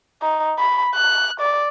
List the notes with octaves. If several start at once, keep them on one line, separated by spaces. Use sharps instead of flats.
D#4
B5
F#6
D5